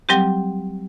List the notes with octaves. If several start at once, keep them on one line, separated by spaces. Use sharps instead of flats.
F#3 G3 C4 G4